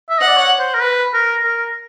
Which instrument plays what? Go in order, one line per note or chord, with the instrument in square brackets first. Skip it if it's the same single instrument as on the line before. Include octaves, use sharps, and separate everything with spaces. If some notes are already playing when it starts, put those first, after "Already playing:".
[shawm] E5
[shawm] D#5 [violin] F#5
[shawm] D5
C#5
C5
A#4
B4
A#4
A#4